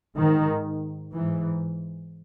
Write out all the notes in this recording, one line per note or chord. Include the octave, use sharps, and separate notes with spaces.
G#2 D#3
G#2 E3